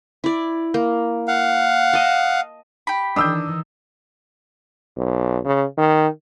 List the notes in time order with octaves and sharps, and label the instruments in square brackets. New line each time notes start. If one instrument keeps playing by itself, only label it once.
[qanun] E4 D5
A#3
[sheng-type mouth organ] F5 F#5
[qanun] D#5 A5
[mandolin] G4 B5
[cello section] D#3 E3 [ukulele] D4 [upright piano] D#6 E6 G6
[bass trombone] B1
C#3
D#3